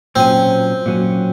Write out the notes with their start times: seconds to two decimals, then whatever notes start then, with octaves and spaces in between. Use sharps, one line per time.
0.16 A#2 F#3 C4 C#4
0.86 A#2 F#3 C#4